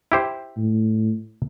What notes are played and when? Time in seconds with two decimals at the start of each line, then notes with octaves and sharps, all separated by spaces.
0.12 E4 G4 C5
0.57 A2